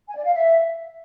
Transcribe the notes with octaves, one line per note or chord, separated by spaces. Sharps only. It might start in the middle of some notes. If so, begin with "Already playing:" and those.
G#5
D5
F5
E5